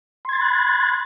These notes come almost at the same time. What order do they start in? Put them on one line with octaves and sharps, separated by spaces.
C6 G#6 A6 B5 F#6